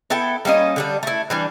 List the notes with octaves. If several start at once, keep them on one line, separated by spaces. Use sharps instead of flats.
B3 E4 A4 G5
G3 A#3 C#4 D#5
D3 G3 D4
A3 E4
E3 G3 D4